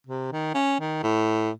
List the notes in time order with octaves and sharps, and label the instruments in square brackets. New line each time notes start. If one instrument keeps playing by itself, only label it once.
[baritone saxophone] C3
D#3
C#4
D#3
A2